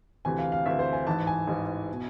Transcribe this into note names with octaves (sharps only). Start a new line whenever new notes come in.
D2 C3 E3 G#5
F5
F5
D2 C3 E3 E5
C5
G#5
A1 G#2 E3 A5
G#5
A1 G#2 E3
B2